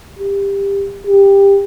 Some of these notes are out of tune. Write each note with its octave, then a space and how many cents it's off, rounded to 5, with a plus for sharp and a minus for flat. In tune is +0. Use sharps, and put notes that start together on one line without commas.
G4 +20
G4 +15